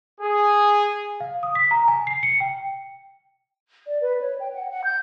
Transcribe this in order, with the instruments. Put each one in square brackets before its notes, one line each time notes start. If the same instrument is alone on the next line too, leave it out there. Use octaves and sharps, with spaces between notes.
[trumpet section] G#4
[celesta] F5
D#6
B6
A#5
G#5
C7
C#7
G5
[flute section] D5
B4
C#5
G5
F#5
F#5
G6